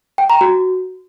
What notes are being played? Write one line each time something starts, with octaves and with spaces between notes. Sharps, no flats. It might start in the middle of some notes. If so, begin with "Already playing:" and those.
G5
A#5
F#4